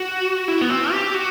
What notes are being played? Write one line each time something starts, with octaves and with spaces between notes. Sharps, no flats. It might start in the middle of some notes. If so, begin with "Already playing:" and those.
Already playing: F#4
E4
B3
C4
G4
F#4